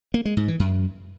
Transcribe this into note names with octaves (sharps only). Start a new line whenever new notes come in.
A#3
G#3
G#2
E3
F#2